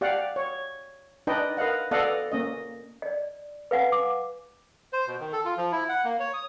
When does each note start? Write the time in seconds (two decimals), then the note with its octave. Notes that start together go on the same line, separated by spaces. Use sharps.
0.01 G4 D5 F5 F#5
0.36 C#5
1.27 D4 D#4 B4 D5 D#5 G5
1.57 A#4 B4 D#5 F5 F#5
1.91 B3 A4 D5 D#5 F5 F#5
2.32 A#3 C#4 D#5
3.02 D5 D#5
3.71 B4 F5 F#5 G#5
3.92 D6
4.93 C5
5.07 B2
5.20 D#3
5.33 A4
5.45 F4
5.57 F3
5.72 E4
5.89 F#5
6.04 A#3
6.20 C#5
6.34 D#6